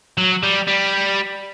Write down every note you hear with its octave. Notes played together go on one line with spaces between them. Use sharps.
F#3
G3
G3